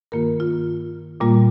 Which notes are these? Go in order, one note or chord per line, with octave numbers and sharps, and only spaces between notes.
G2 D#3 A#3 F4 A#4
F4
A#2 G3 A#3 F4